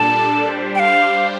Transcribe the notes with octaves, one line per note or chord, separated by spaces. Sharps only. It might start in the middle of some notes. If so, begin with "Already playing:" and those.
Already playing: A#2 G3 D4 A4 D5 A5
G3 D4 G4 C5
G5
F5